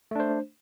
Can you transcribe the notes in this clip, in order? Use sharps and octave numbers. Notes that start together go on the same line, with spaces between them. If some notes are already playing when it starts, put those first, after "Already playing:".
A3 D4 C5